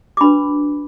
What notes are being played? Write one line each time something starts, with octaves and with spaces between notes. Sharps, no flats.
D6
D4 F#4 B4 B5